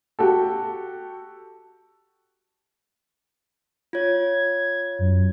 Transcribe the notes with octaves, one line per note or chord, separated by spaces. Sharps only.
F#4 G4 A4
F4 C#5 G#6
F#2